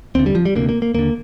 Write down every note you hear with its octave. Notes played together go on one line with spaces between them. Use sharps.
D#2 D3 C4
G3
F3
G3
D2 C3 A#3
A#3
A#3
D#2 D3 A#3